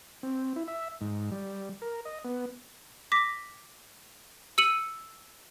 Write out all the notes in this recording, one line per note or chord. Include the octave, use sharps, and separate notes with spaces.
C4
E4
E5
G#2
G3
A#4
D#5
B3
D6 A#6 B6
E6 C#7 D#7 F#7